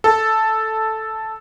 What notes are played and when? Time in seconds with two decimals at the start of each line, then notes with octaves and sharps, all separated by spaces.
0.04 A4